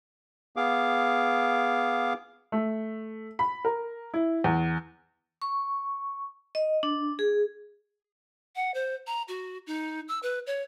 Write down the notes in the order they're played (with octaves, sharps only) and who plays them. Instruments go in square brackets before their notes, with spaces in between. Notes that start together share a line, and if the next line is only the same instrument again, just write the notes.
[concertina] B3 G#4 F5 D6
[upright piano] A3
B5
A#4
E4
E2
[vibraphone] C#6
D#5
D4
G#4
[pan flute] F#5
C5
A#5
F#4
D#4
E6
B4
C#5